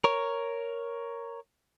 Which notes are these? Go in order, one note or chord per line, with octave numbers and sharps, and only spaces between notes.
A#4 C#5